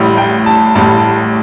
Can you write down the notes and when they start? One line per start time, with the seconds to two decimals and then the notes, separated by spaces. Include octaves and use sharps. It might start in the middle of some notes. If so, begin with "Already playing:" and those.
Already playing: A1 A2 G3
0.17 G5
0.46 A5
0.75 A1 A2 G3 A5